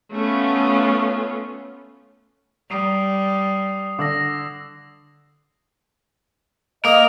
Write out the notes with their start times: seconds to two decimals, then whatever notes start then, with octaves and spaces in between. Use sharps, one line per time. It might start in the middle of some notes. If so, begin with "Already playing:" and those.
0.12 A3 B3 C#4 F4
2.70 G3 D#6 C7 F7
3.99 D3 D6 E6 A#6
6.85 A#3 A#4 D#5 D#6